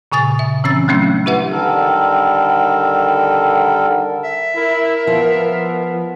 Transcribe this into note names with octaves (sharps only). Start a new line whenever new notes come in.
A#2 C#3 G#5 D#6 A6
E5
E3 C4 C#4 E6 A6
F#3 G3 A3 C#4 D4
E4 G4 B4 E5 F#5
D3 D#3 G3 A4 A#4
E5
E4 A#4
F3 B3